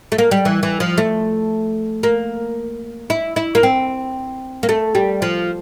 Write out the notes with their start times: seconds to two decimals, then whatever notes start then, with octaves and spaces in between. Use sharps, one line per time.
0.12 A3
0.18 A#3
0.31 G3
0.45 E3
0.63 E3
0.80 F3
0.98 A3
2.03 A#3
3.10 E4
3.36 E4
3.55 A#3
3.63 C4
4.63 A#3
4.69 A3
4.95 G3
5.22 F3